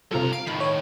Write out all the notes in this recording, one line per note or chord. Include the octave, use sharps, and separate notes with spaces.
G2 C3 F4 A4 A#5
F5 D7
A2 D#3 B5
C#5